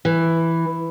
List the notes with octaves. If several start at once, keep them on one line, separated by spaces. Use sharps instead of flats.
E3